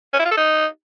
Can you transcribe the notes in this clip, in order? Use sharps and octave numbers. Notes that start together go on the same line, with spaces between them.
C#4
E4
F4
A4
D#4